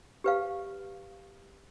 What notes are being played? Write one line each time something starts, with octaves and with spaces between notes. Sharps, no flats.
G4 B4 F5